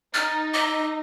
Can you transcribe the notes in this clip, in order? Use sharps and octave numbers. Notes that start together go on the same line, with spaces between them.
D#4 F6 A6
D#5 D6 E6 B6